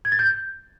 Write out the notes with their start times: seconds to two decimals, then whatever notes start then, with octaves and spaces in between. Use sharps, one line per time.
0.05 G#6
0.12 A6
0.19 G6